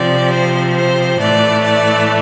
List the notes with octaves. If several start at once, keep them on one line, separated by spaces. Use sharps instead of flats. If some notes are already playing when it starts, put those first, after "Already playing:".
Already playing: C3 F3 C4 D5
C5
C5
A2 E3 A3 D5
D5